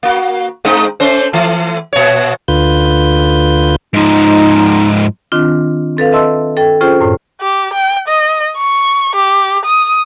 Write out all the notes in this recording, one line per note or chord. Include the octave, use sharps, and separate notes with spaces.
A#3 F#4
G#3 C4 D#4
A3 C#4 C5
E3 A3
A#2 C#5
D2 D3 F4 B4 G6
G#2 F3 D#4
D#3 C4 D4 F4
C4 A4 B4 F5
B4 D#5 E5 A5 C6 E6
A4 G5
C#4 F4 G#4 A4 C5 G5
F#2 A2 C#5
G4
G5
D#5
C#6
G4
D#6